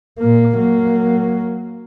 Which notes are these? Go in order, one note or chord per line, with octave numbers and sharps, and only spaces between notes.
A#2 A#3
F#3 A#3